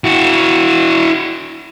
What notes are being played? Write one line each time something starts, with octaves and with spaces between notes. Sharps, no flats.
E4 F#4